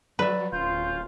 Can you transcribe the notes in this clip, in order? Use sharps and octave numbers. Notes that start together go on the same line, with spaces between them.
F#3 B4 D5 E5
D1 C#4 F4 G6